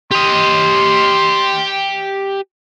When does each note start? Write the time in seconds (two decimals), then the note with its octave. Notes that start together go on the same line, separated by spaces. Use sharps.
0.12 G4 D#5 C6